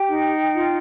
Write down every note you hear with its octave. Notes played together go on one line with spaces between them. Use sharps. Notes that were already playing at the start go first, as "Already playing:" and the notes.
Already playing: G4 G5
D#4
F4